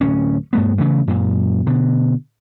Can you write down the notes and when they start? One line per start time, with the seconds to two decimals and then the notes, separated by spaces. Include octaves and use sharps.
0.01 D1 C#4
0.53 G2 A3 B3
0.78 C#3 E3 A3
1.07 F#2 A#2
1.67 B2 D3